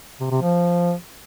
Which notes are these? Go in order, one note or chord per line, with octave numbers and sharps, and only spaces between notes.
C3
C3
F3